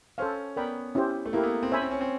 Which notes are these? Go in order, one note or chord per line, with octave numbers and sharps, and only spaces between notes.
C#4 A4 C5 F5
B3 A#4 D5 G5 B5
C#4 E4 G4 C5
A3
A#3 E4 G4 A#4
B3
C4
C#4 C5 E5 G#5 B5
C4
C#4
C4